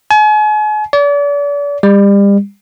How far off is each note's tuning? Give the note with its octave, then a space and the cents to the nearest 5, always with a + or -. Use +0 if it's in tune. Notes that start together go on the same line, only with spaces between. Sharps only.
G#5 +40
D5 -40
G3 +35